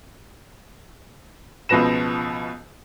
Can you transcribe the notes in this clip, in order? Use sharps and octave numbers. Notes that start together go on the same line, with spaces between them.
C#2 B2 F3 B4 A#6 E7